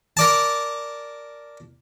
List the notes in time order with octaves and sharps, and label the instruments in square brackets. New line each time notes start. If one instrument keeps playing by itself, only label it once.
[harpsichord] A#4 D5 A5